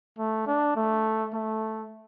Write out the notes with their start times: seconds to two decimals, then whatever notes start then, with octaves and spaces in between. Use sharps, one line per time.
0.18 A3
0.47 D4
0.76 A3
1.33 A3